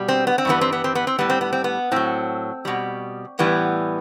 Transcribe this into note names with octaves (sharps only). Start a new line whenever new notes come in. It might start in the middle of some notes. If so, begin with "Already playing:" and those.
Already playing: B2 G3
C4
B3
C4
G2 E3 G3 B3
C4
B3
C4
B3
C4
A2 G3 B3
C4
B3
C4
B3
A2 F#3 C4
B2 G3
A2 E3 G3 B3